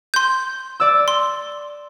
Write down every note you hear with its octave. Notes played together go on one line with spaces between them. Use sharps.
C6 G6
D5 E6
C6